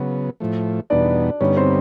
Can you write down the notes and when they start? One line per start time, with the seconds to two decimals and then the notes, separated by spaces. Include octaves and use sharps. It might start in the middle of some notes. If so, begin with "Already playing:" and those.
Already playing: C#3 F#3 B3
0.40 A2 F3 A3
0.90 E2 B2 G3 B3 D4 D#4 D5
1.41 G2 D3 G3 B3 C#4 D#4 C#5
1.57 C4 C5